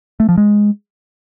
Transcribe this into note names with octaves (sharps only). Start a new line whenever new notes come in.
A3
F3
G#3